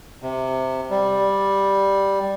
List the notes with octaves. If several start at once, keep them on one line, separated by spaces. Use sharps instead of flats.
C3
G3